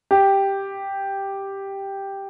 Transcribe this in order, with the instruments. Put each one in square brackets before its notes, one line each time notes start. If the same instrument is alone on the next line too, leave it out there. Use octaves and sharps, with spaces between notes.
[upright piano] G4